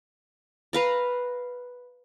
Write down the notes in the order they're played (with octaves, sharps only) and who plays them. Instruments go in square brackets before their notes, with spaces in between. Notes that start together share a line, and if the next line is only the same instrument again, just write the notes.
[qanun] B4 F5 A#5